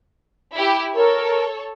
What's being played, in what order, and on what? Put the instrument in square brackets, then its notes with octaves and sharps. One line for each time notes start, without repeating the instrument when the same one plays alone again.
[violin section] E4 G4
[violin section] A4 C#5 [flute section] A#4